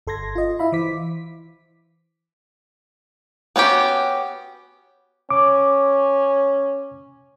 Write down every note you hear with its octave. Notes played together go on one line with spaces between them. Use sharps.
G1 A4 C6 G#6 A#6
F4 D#5
E4 E5 F5 B5
E3 C5 D6 B6
B3 C#4 F#4 G4
C#4 D6